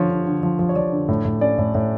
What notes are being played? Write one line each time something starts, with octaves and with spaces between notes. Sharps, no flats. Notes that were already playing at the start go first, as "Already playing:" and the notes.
Already playing: D3 F3 C#5
D3
D3
F3
F3
C#5
F3 D5
D3
A2
A2
C#4 D5
A2
A2